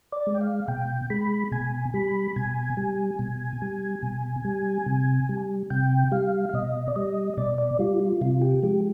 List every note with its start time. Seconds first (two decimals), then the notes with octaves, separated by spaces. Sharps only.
0.12 D5
0.27 G#3
0.34 G5
0.41 F5
0.68 B2 G5
1.10 G#3 B5
1.51 B2 G#5
1.94 G3 B5
2.36 B2 G#5
2.77 G3
3.19 B2
3.62 G3
4.02 B2
4.45 G3
4.86 C3
5.29 G3
5.70 C3 G5
6.12 G3 F5
6.49 F5
6.53 B2 D#5
6.88 D5
6.96 G3 D#5
7.37 B2 D5
7.58 D5
7.79 G3 F4
8.00 F4
8.21 C3 F4
8.42 G4
8.63 F3 G#3 G4